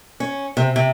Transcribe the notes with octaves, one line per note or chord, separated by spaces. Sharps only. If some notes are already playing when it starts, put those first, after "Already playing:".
C#4
C3
C3